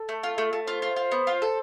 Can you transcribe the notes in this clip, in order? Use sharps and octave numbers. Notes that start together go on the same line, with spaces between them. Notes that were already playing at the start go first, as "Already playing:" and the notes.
Already playing: A4
A3
F4
A3
A3
F4 C5
F4
F4
B3
F4
A4